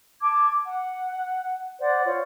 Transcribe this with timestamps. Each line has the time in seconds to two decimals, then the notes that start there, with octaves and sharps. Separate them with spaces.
0.20 A5 D6 G#6
0.64 F#5
1.79 C5 D5 F#5
2.05 F4 C5 C#5